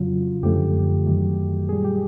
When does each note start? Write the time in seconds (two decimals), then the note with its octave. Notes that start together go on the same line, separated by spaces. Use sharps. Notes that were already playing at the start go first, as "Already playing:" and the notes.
Already playing: F2 C#3 F#3 F4
0.43 F#2 D3 F3 A3 G4
1.06 F#2 D#3 F#3 A3
1.69 A#2 G3 G#4
1.84 G4